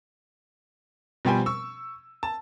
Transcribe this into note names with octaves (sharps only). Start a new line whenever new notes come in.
B2 F3 G3 C5 G5 G#5
C#6 E6
A5